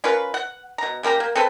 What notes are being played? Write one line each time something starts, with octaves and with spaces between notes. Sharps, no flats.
C#4 F4 A#4 B4
F#5
B2 A#5
C#3 A#3 G4 A#5
A#3
C4 A4 B4 B5